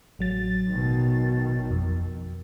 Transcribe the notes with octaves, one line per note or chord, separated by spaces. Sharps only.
A1 F#3 A6
B2 D#3
F2